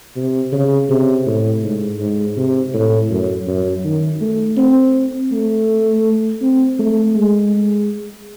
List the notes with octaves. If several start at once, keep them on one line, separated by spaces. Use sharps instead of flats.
C3
C#3
C3
A2
G#2
G#2
C3
A2
F#2
F#2
D#3
A3
C4
A3
C4
A3
G#3